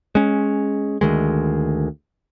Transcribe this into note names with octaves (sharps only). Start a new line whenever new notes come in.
G#3 C#4
D2 D#3 G#3